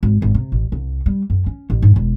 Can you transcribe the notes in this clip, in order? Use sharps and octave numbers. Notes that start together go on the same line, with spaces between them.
G#1
G#1
C3
A1
C2
G3
F#2
C#4
A1
G#2
E1